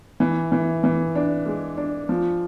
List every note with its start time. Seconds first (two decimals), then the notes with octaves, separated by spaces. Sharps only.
0.20 E3
0.52 E3
0.84 E3
1.15 D4
1.46 G#3
1.77 D4
2.09 F3